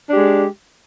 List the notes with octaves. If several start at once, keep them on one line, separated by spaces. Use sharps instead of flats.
G#3 D4 G4